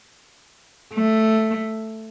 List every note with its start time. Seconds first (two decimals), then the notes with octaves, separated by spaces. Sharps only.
0.94 A3